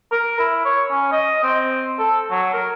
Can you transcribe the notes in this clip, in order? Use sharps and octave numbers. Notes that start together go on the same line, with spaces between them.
A#4
E4
C#5
C#4
D#5
C4
A4
F#3
A#4